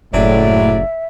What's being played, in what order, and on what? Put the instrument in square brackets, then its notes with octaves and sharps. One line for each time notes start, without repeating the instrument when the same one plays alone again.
[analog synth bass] F#1 [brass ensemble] A2 [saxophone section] F#3 G#3 D5 [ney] E5